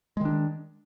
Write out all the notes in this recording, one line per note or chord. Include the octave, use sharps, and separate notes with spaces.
D#3 G#3 D4